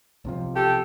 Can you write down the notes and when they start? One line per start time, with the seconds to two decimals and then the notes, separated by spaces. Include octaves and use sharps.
0.25 B1 C3 F3
0.56 G4 A4